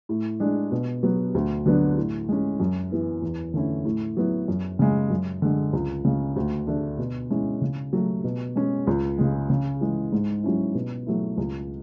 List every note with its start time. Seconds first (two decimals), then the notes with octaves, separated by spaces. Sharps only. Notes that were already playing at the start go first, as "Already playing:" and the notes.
0.09 A2
0.40 G#3 D4
0.72 B2
1.03 F#3 B3
1.34 D2
1.66 D3 F#3 B3 D4
1.97 A2
2.29 G#3 C#4
2.60 F#2
2.91 E3 B3 E4
3.22 E2
3.54 D3 A3 C#4 E4
3.85 A2
4.17 F#3 B3 E4
4.48 F#2
4.79 C#3 G#3
5.11 F#2
5.42 D3 G#3
5.73 C#2
6.05 C#3 G#3
6.36 D2
6.67 D3 A3 D4
6.99 B2
7.30 G#3 C#4 E4
7.61 C#3
7.93 F#3 A3
8.24 B2
8.56 G#3 C#4
8.87 C#2
9.18 C#3 G#3
9.50 C#3
9.81 E3 G#3
10.12 G#2
10.43 F#3 C#4 E4
10.75 B2
11.06 F#3 A3 E4
11.37 C#2